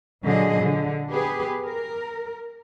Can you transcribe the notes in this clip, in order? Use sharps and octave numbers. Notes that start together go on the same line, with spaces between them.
A#2 D3 F#3 G#4 D#5
D3
B3 G4 G#4 B4
A#4